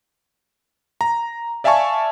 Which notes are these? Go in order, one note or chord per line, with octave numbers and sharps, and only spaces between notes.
A#5
D5 E5 F5 G#5 A5 C#6